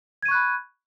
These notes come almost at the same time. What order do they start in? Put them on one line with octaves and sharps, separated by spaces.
G#6 D#7 C#6 F#6 B5